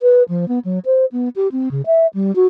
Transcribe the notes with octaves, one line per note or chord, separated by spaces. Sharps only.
B4
F3
B3
F#3
C5
B3
G4
C4
C#3
E5
G3
F#4